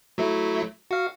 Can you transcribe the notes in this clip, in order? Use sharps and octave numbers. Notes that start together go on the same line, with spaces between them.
F#3 A3 E4
F#4 F5